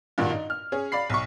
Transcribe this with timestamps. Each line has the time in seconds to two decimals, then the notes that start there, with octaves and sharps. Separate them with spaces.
0.18 G2 A#2 D#3 F4 F#4
0.30 D#4
0.50 F6
0.72 C#4 G#4 C#5
0.92 D5 F5 B5 C7
1.10 B1 C#6